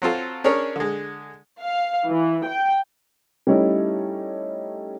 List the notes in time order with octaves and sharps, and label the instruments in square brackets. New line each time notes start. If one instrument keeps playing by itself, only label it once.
[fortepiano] F#3 C4 F4 A4
C#4 D4 G#4 A#4 C#5
D3 G#3
[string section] F5
E3
G5
[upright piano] G3 A3 C#4 D#4 E4 A4